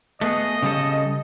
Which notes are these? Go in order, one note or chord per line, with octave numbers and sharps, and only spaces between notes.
A3 B3 G#4 D#5
C#3 G3 A4